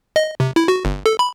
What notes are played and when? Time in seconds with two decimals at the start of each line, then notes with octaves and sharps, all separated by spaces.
0.16 D#5
0.40 C3
0.56 E4
0.68 F#4
0.85 G1
1.06 A4
1.19 B5